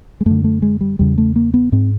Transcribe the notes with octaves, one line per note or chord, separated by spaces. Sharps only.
G#3
F#2 D3 A3
A3
G#3
G3
E2 C#3 G3
A3
A#3
B3
G#2 C4